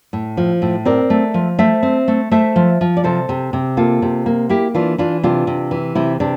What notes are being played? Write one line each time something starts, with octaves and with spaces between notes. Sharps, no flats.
A2
F3
A2
C4 A#4 D5
A3
F3
A3 C5 E5
C4
A3
A3 C5 E5
F3
F3
D5
C3 A4 C5
C3
C3
A#3 F4 A4
C3
A#3
A#3 E4 G4
E3 D4 F4
E3 D4 F4
C3 D4 F4
C3
E3
C3 E4
C3 D4